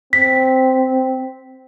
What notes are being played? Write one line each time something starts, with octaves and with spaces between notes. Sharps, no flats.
C4 B6